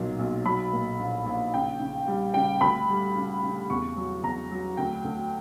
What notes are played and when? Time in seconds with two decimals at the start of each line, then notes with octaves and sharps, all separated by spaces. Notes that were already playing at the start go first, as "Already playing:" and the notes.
Already playing: B1 A#2 F#3
0.19 B1
0.45 F#3 B5
0.73 A#2
0.99 A#1
1.26 A#1
1.53 C#3 G5
1.80 C#3
2.08 G3
2.34 C#3 G5
2.61 D2 B5
2.89 G3
3.16 C#3
3.43 C#3
3.70 E2 C#6
3.96 F#3
4.23 E2 A#5
4.51 F#3
4.77 D2 G5
5.04 D2